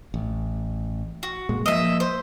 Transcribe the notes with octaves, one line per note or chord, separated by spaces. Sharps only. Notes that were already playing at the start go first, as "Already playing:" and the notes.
A1
F#4
A#2 G#3
F3 A#3 D#5 E5
C5